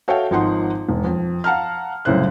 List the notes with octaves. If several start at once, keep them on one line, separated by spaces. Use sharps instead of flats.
F#4 A4 C#5 E5 F5 G5
G#1 F3 D#4 F#5 C6
E1
F2
F5 F#5 A5 A#5 F6
C2 F#2 A2 C#3 C5 F#6